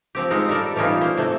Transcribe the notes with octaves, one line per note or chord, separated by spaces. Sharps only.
F3 C4 G4
G#3 C4 D#4 F4
G3 A4 A#4 D5
E3 G3 A3 C#4 D#4 F4
A#3 C5
C3 A3